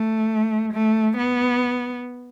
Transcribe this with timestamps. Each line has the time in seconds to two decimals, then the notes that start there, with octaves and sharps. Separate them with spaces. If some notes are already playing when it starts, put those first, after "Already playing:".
Already playing: A3
0.73 A3
1.17 B3